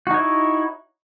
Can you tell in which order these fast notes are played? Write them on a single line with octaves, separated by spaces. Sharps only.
F#4 D#4 C#5 E4